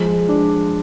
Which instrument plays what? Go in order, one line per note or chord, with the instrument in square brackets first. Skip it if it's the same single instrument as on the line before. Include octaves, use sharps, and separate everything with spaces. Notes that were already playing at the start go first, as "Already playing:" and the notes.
Already playing: [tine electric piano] F3 [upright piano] G#3
[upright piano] D4